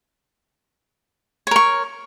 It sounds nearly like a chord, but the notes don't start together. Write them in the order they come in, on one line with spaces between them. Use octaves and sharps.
C#5 A#4 C#6